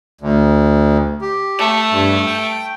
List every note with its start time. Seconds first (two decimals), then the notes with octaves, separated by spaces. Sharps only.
0.21 D2
1.21 G4
1.58 A3
1.91 G2
2.26 G5